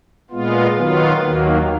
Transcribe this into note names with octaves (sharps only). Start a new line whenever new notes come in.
A#2 G#3 B3 F4
D#3 F#3 B3 F4
D#2 D#3 F#3 A#3